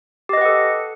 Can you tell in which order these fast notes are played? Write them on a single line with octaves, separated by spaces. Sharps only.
G4 D#5 B4 F#5 A4